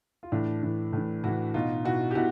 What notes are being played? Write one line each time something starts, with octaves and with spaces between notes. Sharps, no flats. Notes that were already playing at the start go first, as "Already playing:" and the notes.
F4
A2 E3 D4 E4
A2 E3
A2 E3
A2 E3 E4 F#4
B2 D#4 F4
B2 E4 F#4
G4
B2 E4 F#4